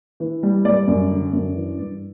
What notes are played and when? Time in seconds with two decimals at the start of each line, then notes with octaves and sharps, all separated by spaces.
0.20 E3
0.43 G3
0.65 G3 D5
0.87 F#2
1.10 D3
1.33 F#2
1.55 E3
1.79 G2